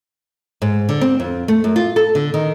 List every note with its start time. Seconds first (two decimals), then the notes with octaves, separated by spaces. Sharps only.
0.62 G#2
0.89 D3
1.01 C4
1.20 F2
1.48 A3
1.64 F#2
1.76 F4
1.96 A4
2.15 D3
2.34 D#3